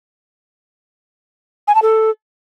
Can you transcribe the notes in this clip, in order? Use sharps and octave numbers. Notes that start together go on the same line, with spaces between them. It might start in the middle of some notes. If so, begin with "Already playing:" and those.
G#5
A5
A4